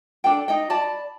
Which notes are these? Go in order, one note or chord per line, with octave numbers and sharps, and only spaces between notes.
D4 A4 G5
D#4 D#5 G5
D5 A5 B5